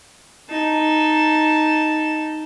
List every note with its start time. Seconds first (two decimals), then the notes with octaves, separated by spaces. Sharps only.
0.49 D#4 A5